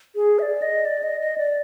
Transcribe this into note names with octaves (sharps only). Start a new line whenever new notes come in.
G#4
E5
D5
D#5
D5
D#5
D#5
D5